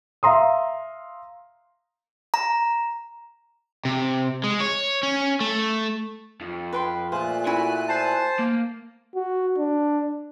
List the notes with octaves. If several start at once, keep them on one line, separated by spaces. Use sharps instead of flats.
E5 F5 A#5 C6 D#6
A#5
C3
G#3
C#5
C#4
A3
F2
B4 G5 C6
A#2 A3 G#4 C5 F5 F#6
E4 F#4 E5 G#5
C5 A5
A#3
F#4
D4